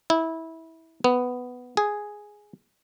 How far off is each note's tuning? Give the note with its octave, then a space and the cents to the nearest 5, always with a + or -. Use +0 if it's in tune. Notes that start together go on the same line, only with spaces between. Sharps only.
E4 -20
B3 +5
G#4 +0